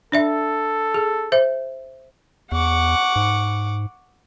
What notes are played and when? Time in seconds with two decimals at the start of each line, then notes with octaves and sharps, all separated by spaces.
0.12 D4 A4 D5 E5
0.94 G#4
1.32 C5 E5
2.52 E2 F#5 C#6 D6
3.16 G#2